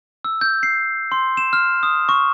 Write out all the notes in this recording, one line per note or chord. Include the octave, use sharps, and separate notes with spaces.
E6
G6
C7
C6
E7
F6
D#6
C#6